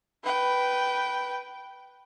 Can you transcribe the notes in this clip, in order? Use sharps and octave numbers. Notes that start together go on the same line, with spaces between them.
B4 G5